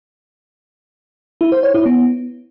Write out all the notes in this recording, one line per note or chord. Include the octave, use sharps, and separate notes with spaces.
E4
C5
C#5
E4
B3